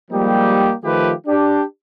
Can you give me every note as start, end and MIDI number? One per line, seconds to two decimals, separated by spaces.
0.11 0.73 53
0.11 0.73 55
0.11 0.73 56
0.11 0.73 58
0.11 0.73 63
0.11 0.73 67
0.84 1.12 51
0.84 1.12 53
0.84 1.12 57
0.84 1.12 65
0.84 1.12 67
0.84 1.12 71
1.27 1.63 62
1.27 1.63 67